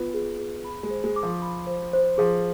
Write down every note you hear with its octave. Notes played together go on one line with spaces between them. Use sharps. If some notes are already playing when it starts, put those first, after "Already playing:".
Already playing: B3 F4 B4
G#4
G#4
B5
G#3
C5
G#3
D6
F3
B5
C5
C5
F3 G#4